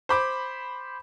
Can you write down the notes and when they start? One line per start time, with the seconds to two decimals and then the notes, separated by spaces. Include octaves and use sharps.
0.09 C5 B5 D6